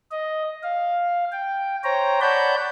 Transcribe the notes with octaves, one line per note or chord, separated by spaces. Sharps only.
D#5
F5
G5
C5 C#5 G5 A#5
C#5 D5 F#5 A5 B5 G6